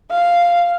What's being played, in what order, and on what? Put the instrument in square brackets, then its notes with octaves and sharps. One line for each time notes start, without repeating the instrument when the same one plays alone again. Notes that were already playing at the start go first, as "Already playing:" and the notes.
[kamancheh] F5